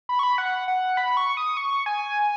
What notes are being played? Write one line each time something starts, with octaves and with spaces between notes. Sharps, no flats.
B5
C#6
B5
F#5
F#5
B5
C#6
D#6
C#6
G#5